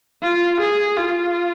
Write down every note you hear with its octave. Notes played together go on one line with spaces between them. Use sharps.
F4
G#4
F4